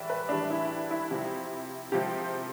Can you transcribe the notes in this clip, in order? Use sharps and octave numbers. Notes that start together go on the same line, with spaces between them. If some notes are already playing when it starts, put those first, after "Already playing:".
Already playing: A2 E3 G3 D5 E5
B4
A2 E3 G3 D4
E4
E4
C3 F3
C3 F3 G4